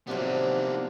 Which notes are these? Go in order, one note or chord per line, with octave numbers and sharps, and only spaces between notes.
A2 C3 D#3 F3 F#3 A#3 B3 D4